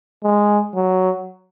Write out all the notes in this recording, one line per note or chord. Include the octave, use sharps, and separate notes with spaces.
G#3
F#3